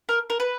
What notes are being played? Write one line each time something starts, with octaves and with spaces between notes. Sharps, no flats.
A#4
A#4
B4